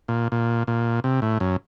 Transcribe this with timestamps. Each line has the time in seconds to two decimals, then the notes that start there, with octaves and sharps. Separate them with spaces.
0.08 A#2
0.32 A#2
0.67 A#2
1.04 C3
1.22 A2
1.40 F#2